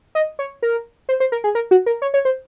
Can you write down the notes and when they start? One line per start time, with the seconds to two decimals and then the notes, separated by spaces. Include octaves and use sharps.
0.15 D#5
0.39 C#5
0.63 A#4
1.09 C5
1.20 C5
1.32 A#4
1.44 G#4
1.55 A#4
1.71 F#4
1.86 A#4
2.02 C#5
2.14 C#5
2.25 C5